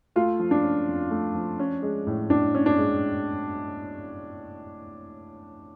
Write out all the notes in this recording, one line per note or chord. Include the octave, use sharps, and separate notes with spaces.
A3 F4
F3
D4
C#4
F2
A3
F3
C#4
G#3
A2
A2 D4
C#4
D4
G#3